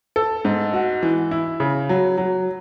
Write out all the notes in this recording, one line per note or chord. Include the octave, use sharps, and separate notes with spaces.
A4
G#2
F#4
E3
E4
C#3
F#3
F#3